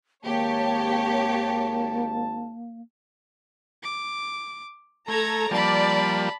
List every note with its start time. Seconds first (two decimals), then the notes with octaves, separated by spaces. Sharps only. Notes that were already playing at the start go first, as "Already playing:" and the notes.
0.24 G#1 A#3 G4 C#5 A5
3.83 D6
5.08 A3 A4 A#5 G#6
5.51 F3 G3 A#3 D5 A5 B5